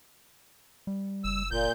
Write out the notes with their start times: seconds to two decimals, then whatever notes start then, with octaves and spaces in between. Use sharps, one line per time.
0.87 G3
1.24 F#1 E6
1.51 F#1 A#2 G6